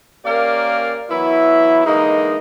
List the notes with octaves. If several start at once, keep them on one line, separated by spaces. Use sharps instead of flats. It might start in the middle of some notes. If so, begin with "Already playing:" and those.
A#3 C#4 G4 A#4 D5 F5
E3 F#3 B3 E4
D3 E3 G#3 A#3 D#4